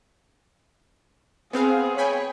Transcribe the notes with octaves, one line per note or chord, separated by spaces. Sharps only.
B3 C4 G#4 F5
C#5 G5 G#5 B5